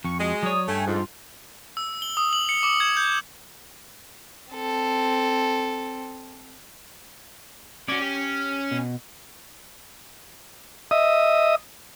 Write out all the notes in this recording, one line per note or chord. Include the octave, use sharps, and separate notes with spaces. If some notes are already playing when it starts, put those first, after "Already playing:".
F2 C#6
G#3 F#4 D#5
F#3 C#5 D5 D#6
G2 A3 C#4 G5 G#5
F2 G#2 F4
E6
G7
D#6
F#7
C#7
D6
G#6
G6
C4 A4
C#4 F#4 D5
G4
B2
D#5 E5 D#6